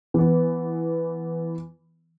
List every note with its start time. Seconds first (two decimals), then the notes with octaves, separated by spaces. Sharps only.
0.14 E3 B3